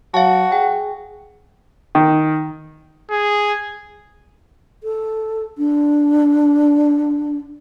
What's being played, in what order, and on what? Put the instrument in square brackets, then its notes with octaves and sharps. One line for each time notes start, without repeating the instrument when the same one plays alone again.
[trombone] F#3 [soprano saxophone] F#4 [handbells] F5 A5
[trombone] G#4 [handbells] G5
[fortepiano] D#3
[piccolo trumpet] G#4
[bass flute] A4
D4